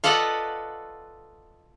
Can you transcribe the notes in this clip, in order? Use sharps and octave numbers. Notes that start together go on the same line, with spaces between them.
F4 A4 B4 D5 D#5 F#5